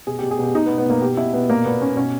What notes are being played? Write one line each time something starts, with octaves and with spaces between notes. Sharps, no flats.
B2 G#4
G4
B2
G#4
B2 G4
B2 D#4
B3
B2
B3
B2 A#3
B2 G4
B2 E4
B2 B3
A#2 A#3
A#2 B3
A#2 C#4
B2 C#4